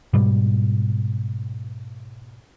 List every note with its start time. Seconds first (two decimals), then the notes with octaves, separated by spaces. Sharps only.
0.13 G#2 B2 G3